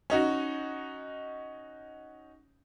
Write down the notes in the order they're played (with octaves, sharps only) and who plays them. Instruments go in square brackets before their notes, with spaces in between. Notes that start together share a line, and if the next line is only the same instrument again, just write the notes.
[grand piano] C#4 D#4 F#4